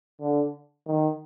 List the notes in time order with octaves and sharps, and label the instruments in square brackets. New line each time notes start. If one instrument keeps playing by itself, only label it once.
[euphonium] D3
D#3